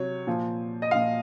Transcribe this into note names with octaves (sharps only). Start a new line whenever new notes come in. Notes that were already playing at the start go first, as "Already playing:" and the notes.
Already playing: C3 F#3 C#5
A#2 F3
D#5
A#2 F3 F5